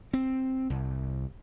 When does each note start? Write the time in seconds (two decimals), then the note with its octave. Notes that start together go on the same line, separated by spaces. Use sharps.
0.14 C4
0.70 C2